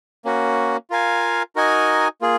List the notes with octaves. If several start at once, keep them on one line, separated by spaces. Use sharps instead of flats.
A#3 C#4 F#4
F4 A#4 F5 G#5
D#4 F#4 A#4 D#5 G#5
A#3 F4 G#4